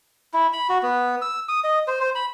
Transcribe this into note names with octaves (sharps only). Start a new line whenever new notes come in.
E4
B5
F#4
B3
E6
D#6
D#5
C5
C5
B5